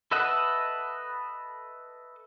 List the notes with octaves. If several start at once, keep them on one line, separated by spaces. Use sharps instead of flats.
A4 B4 D#5 E5 F#5